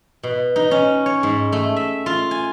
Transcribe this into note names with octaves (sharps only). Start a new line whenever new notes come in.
B2
D#4
C#4
C#5
G#2
A3
E5
F4
G#5